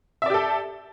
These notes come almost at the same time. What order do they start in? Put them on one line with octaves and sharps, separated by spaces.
E5 D5 G4 A4